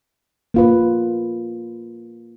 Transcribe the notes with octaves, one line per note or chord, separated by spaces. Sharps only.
A#3 F4 B4